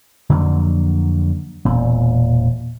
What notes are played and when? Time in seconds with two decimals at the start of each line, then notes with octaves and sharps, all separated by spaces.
0.30 F2 D3 F#3 A#3
1.65 E1 A#2